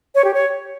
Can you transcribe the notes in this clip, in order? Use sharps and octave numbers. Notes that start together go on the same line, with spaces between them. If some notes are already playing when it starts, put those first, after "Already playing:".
C#5
G4
C#5